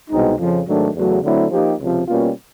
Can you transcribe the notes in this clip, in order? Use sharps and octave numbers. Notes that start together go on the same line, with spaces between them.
C2 B2 G#3 C4 D#4
F2 C#3 F3
G#2 D#3 F#3 A3 D4
E2 C#3 F#3 A3
D3 F#3 A3 C4 E4
F3 A#3 D#4 G4
C#2 C3 F3
B2 G3 A#3 C#4 F4